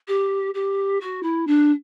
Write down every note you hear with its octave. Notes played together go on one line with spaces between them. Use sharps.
G4
G4
F#4
E4
D4